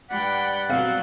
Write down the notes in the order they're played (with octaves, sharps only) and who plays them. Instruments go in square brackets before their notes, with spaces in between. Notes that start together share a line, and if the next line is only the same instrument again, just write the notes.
[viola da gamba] G2 G3 [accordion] D5 F#5 [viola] G5 B5
[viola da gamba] B2 F#3 [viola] C4 [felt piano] F5